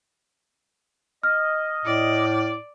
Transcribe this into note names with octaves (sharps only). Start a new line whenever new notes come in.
D#5 F6
A2 D5